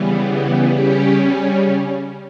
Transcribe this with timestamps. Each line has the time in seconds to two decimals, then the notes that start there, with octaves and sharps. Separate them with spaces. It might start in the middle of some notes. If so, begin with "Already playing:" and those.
Already playing: C#3 E3 G3 B3
0.70 C#3 G3 C#4 G4